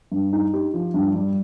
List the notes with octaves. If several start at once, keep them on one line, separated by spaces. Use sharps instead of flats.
G2
D#4
G4
F3
G2
G3